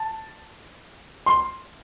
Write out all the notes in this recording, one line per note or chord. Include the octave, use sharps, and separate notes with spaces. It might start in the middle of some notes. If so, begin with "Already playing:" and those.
Already playing: A5
C6